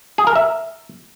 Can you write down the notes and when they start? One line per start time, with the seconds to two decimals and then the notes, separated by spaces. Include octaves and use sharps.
0.18 G#4
0.27 A#4
0.36 E5